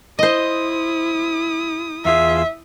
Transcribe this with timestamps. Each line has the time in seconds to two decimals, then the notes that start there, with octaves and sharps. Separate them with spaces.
0.19 E4 C5 D#5 D#6
2.05 E2 F4 G#4 E5